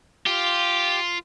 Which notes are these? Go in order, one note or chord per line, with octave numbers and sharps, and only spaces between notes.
F4 G4